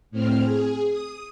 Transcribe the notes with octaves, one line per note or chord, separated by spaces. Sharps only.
A2 C4 F6
G#4
D#6